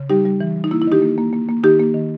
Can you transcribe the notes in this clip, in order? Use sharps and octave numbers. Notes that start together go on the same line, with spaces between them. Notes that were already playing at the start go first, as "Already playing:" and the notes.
Already playing: C#3
G3 D#4 G4
G3
E3
G3
D#4
A#3 E4
E4
D#3 D#4 G4
A#3
A#3
A#3
A#3
D#3 D#4 G4
A#3
D#3